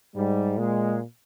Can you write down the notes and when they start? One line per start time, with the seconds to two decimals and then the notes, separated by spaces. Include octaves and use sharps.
0.15 G#2 G3
0.58 A#2 G#3